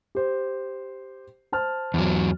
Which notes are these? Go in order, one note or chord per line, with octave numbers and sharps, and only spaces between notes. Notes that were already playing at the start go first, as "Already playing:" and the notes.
G4 C5
C5 A5 F6
E2 F#3